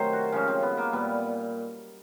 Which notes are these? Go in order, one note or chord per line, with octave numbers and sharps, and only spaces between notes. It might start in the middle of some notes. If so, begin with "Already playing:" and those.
Already playing: C3 D#3 F#3 A3 C5
F#4
C#3 F3 G#3 C#4
C4
B3
A#3
A#2 G3 B3